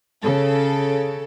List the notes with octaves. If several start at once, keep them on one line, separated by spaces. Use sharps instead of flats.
C#3 A4